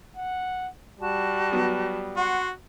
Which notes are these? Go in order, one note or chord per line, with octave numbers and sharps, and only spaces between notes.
F#5
G3 F#4 A5
F#3 B3
F#4 F#5 C6